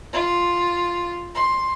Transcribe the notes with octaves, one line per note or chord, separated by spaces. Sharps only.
F4
C6